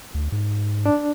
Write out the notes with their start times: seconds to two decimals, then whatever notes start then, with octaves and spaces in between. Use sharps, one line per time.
0.14 D2
0.32 G#2
0.86 D4